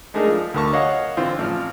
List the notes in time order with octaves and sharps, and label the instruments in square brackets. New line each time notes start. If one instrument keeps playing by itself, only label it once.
[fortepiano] G#3 A3 D4 D#4 G#4 A#4
F3
D2 D3 A#4 A5 C#6
C#5 D#5 F5 F#5
D3 E3 C4 F4
A1 F3 F6